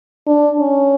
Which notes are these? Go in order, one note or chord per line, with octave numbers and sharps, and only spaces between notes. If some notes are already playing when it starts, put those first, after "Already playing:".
D4
C#4